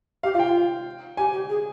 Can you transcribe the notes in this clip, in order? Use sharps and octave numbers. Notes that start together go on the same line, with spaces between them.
G4 F5
F4 F5
G5
F4
G4 G#5
G4
G#4